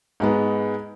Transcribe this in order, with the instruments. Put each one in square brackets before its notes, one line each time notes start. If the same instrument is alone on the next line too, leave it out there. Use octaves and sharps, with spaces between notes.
[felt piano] G#2 G#3 B3